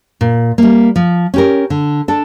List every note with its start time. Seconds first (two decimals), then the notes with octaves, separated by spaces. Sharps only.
0.21 A#2
0.58 G3 A#3
0.96 F3
1.34 C#4 G4 A#4
1.70 D3
2.08 D4 A4